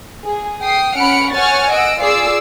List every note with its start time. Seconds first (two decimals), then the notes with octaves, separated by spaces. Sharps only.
0.25 G#4
0.62 G5 D#6 C7
0.96 C#4 F#5 B5 F6 C#7 D7
1.32 C#5 F#5 G#5 C#6 F6 A6
1.71 D#5 F#5 E6 D7
2.02 F4 G#4 D5 D6 E6 C7